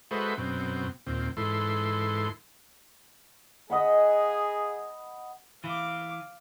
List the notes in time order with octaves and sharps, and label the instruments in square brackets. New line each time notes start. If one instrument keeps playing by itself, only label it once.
[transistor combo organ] G#3 F#4 A4 B4 C5 E5
F#2 B2 C4
D#2 A#2 C4
G#2 E3 A4 C6
[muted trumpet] G#4 [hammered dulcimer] D#5 F#5 B5
[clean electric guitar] E3 [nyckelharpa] F5 D6